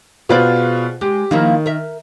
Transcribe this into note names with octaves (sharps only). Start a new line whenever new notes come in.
B2 F4 G#4 B4 C5 D5
G#3 G4
D#3 F3 A#3 E4
A#4 E5